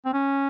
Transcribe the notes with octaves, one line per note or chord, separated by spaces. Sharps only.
C4
C#4